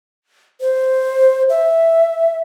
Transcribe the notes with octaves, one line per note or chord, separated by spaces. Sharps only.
C5
E5